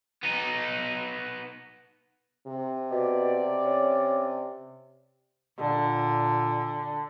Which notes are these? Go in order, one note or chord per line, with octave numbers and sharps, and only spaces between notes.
B3 D#4
C3
B2 D5
C#4
A#2 D3